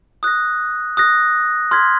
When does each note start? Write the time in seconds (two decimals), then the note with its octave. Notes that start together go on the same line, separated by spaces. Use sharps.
0.23 D#6 F#6 A#6
0.97 D#6 F#6 A#6
1.71 C6 F6 G#6 B6